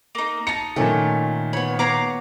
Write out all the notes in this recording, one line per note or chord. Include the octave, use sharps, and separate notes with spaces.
A#3 D#4
D#4 A5 C#7
A#2 D#3 A3 C#4
B3 C#5 B5
B3 C#5 F5 A#5 D6